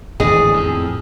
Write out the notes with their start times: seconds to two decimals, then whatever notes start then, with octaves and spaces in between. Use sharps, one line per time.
0.20 G#1 E2 A2 D3 G#4 D#5
0.54 F2